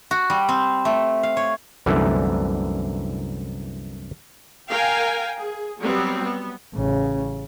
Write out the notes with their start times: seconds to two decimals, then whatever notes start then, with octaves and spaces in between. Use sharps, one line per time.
0.11 F#4
0.30 G3
0.49 C4
0.85 A3
1.23 F5
1.37 C#5
1.86 C2 F#2 D3 E3 A3
4.68 A#4 F5 G5 G#5
5.37 G#4
5.81 F#3 G3 B3 C4
6.25 B3
6.74 A1 C#3